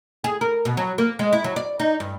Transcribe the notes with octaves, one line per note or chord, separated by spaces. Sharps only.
G#4
A#4
B2
F#3
A#3
G#3
E4
F#3
D5
D#4
G2